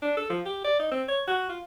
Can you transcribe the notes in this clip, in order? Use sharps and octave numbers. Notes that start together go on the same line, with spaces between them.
D4
A4
F3
G4
D5
D#4
C4
C#5
F#4
F4